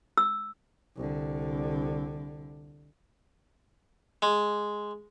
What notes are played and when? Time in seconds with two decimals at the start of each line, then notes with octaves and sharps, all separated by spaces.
0.17 E6
0.97 C2 D3
4.22 G#3